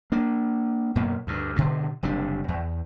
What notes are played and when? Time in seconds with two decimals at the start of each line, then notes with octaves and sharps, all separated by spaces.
0.12 A#3 D4
0.95 F#2 B2 A#3 B3
1.27 D2 G2
1.56 G2 B2 D3
2.03 F#1 C3 G3 D4
2.48 E2